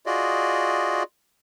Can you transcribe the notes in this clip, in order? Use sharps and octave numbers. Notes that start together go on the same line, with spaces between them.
F4 F#4 G#4 D5 D#5